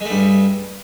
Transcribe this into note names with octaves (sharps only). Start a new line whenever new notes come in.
G2 G#3 A3